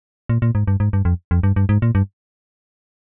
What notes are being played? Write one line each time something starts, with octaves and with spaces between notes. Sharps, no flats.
A#2
A#2
G#2
G2
G#2
G2
F2
F2
G2
G2
G#2
A#2
G2